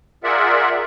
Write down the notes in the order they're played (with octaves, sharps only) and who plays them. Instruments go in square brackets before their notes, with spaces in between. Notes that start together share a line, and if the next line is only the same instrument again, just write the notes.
[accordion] F4 G#4 A#4 D5 E5 F#5